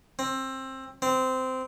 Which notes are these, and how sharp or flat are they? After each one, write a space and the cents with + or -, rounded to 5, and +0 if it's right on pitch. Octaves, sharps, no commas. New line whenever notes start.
C4 +20
C4 -15